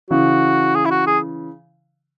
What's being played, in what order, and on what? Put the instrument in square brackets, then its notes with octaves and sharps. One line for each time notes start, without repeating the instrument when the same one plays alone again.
[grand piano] C#3 E3 [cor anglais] F#4
[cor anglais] G#4
E4
F#4
G#4